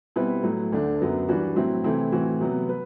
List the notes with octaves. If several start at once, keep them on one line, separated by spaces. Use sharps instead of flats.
B2 G3 C4 E4 B4
A2 F#3 A3
D2 D3 A3 D4
F#2 F#3 B3
E3 G3 D4 F#4 B4
A2 F#3 C4 E4
C3 E3 A3 C4 E4
A2 E3 A3 C4 F#4
C3 F#3 B3
B4